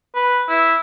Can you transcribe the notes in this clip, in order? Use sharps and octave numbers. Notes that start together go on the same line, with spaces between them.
B4
E4